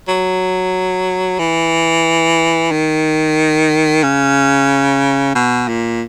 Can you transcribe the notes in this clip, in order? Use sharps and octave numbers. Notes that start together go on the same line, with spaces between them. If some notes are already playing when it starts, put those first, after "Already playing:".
F#3
E3
D#3
C#3
B2
A#2